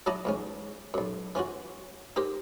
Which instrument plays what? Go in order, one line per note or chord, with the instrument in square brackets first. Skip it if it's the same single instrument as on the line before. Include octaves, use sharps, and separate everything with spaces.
[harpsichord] F#3 D4 E4 D#5 A5 A#5
E2 G#2 C#4
B1 F#2
E3 C#4 F4 F#4
D#4 G4 A#4 C5